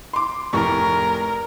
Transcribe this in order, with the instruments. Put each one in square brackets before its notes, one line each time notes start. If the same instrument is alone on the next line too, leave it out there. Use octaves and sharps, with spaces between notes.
[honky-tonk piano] C6 D6
[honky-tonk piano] F1 A2 C#6 [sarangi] A#4